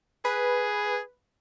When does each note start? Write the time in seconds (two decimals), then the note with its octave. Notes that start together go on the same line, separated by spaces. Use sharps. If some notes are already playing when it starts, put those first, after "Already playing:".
0.25 G#4 B4